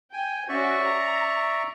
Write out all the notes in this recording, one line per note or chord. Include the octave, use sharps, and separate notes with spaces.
G5 G#5
C#4 F#4 D5 E5 C#6
A#5